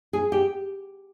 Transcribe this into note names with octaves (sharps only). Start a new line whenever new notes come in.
G#4
G4